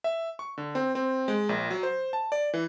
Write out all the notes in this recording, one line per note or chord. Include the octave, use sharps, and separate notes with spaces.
E5
C#6
D3
C4
C4
G#3
A#1
F#3
C5
A5
D5
E3